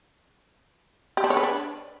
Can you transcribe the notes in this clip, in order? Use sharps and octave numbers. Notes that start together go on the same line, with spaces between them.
G4
D4
C#5
B4
D4